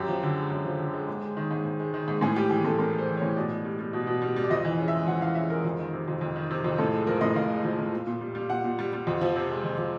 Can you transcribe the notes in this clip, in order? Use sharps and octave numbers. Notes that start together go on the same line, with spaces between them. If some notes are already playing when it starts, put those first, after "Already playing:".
Already playing: F#2 G4
F3
D3
G#3
F#2
F3
D3
G#3
G#2
G#3
D#3
G#2
G#2
G#3
D#3
G#2
A2 G#4
G3 G4
E3 G#4
A2 A4
A2 A#4
G3
C5
E3
A2 C#5
B2 D5
B2
G3
G3
B2
B2
G3
G3
D5
F2 D#5
E3
C#3
E5
G#3
F2 F#5
E3 F5
C#3 E5
G#3 A#4
F2
D#3
C3
F2
F2
D#3
C3
F2
A2 A4
G#3
F3 A#4
A2 D#5
A2 F5
G#3
F3
A2
A#2
A#2
G3
G3
A#2 F#5
A#2
G3
G3
F2
F3
C3
G#3
F2
F3